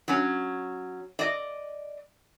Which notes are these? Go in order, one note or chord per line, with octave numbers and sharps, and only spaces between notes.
F#3 C#4
D5 D#5